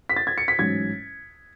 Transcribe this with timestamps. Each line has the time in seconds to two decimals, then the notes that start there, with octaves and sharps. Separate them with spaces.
0.09 B6
0.16 A6
0.27 G#6
0.38 C#7
0.48 B6
0.58 A1 G#2 F#3 C#4 G#6